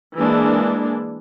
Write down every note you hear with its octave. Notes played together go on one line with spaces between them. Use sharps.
E3 G#3 A#3 D4